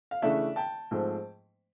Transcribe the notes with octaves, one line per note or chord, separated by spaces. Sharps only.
F5
C#3 E3 A3 D4 D5 E5
G5 A5
G#2 F3 A3 C4